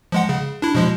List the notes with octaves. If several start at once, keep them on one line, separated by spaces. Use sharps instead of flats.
F3 G#3 F#5
C#3
D4 E4
B2 F3 G#3